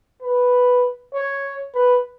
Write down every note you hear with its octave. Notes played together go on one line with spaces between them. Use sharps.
B4
C#5
B4